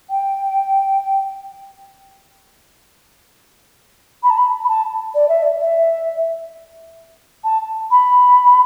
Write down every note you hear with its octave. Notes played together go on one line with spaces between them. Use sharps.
G5
B5
A5
B5
B5
A5
D5
E5
D5
E5
A5
B5